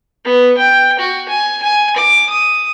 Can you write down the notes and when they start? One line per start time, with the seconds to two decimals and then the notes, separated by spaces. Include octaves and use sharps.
0.25 B3
0.58 G5
0.99 F#4
1.29 G#5
1.63 G#5
1.97 D6
2.30 D#6